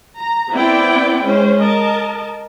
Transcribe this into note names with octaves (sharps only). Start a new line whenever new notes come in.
A#5
B3 C4 E4 D5 G5
G#3 C#4 C5
A#4 D#5 A5